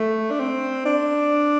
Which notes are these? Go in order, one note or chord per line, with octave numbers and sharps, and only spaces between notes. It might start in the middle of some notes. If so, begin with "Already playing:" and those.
Already playing: A3
D4
C4
D4